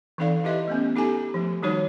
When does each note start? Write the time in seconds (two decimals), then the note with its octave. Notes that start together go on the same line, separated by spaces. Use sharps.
0.18 E3 C4 D#4 A4 D5 F5
0.44 E4 G4 B4 D#5 E5 C6
0.68 A3 B3 C#4
0.96 D#4 G4 A4 G#5 A#5
1.34 F3 A3
1.62 D#3 G3 A#3 D#4 F#4 C#5